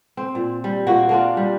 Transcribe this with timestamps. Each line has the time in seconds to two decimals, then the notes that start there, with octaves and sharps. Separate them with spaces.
0.17 C4
0.35 A#2
0.64 G3
0.87 A#2 A#3 F#4
1.09 A#3 D4 F4
1.37 G3